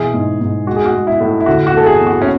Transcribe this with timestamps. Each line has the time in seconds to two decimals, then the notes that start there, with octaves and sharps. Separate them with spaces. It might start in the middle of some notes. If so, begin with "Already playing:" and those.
Already playing: B2 E3 G#4
0.14 G#2
0.41 G#2
0.67 G#3 F#4
0.76 G#4
0.86 F#4
0.94 G#3
1.07 E4
1.20 A2
1.40 E4
1.46 D3 F#4
1.67 F#4
1.74 A3 A4
1.86 G#4
2.00 E2
2.07 F#4
2.22 C#4